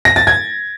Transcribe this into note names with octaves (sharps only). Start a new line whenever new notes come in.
A#6
A6
G#6